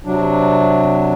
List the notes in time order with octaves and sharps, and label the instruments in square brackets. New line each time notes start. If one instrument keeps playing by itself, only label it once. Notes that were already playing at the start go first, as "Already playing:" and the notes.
[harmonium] C3 F#3 D4